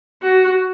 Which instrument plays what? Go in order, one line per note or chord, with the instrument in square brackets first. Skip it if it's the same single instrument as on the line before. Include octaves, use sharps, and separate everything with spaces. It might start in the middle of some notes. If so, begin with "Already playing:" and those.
[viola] F#4